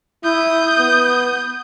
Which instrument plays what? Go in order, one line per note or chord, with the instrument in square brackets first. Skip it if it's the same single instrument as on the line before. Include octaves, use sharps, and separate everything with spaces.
[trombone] E4 [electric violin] D#6 G6
[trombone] B3